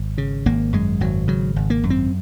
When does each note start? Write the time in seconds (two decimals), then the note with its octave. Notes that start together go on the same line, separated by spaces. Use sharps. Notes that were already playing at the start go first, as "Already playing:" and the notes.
Already playing: G#1
0.18 C#3
0.46 G#1 A#3
0.73 F#2 G#3
1.01 G#1 F#3
1.28 C#3 F#3
1.56 G#1
1.70 A#3
1.83 F#2
1.90 C4